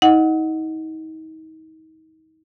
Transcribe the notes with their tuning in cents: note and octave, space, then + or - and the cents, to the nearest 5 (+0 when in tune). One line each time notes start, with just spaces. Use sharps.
D#4 +35 D#5 +0 F#5 -5